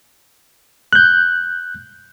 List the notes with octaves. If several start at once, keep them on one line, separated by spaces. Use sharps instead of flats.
F#6 G6